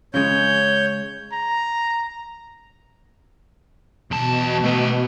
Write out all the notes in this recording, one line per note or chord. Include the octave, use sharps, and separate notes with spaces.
C#3 G#3 C#5 G6
A#5
E2 B2 A5
A3 B4